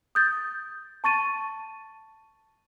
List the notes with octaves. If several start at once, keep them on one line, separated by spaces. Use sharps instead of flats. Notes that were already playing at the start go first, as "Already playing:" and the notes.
D#6 G6 A6
A5 C#6 A6 D#7